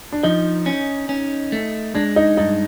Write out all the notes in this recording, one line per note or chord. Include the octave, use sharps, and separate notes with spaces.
D4
F3 D#4
C#4
C#4
A3
G#3 D4
D#4
G2 D#4